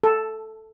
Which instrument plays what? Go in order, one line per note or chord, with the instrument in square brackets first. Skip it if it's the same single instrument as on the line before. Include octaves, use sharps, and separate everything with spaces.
[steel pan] A4